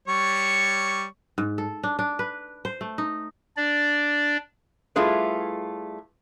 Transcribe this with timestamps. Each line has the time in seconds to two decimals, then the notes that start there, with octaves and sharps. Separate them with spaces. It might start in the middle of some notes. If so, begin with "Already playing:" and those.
0.08 G3 C#5 C#6
1.38 G#2
1.58 A4
1.83 D4
1.99 D4
2.19 B4
2.65 C5
2.81 A3
2.98 D#4
3.57 D4 D5
4.96 G3 A3 E4 F4 G#4 B4